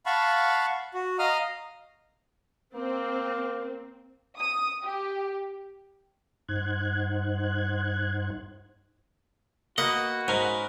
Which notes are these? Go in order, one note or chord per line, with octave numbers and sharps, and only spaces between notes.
F5 F#5 A5 B5 C#6
F#4
D#5 F5 A#5 D#6 F6
A#3 C4
D#6
G4
G2 D#4 C5 F#5 F#6 G#6
A#3 F#4 B4 D#5 F#5
G#2 C#4 A#4 B4